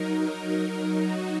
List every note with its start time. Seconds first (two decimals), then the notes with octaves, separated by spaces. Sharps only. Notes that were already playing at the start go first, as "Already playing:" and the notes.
Already playing: F#3 D#4 A#4
1.01 F#3 D#4 F#4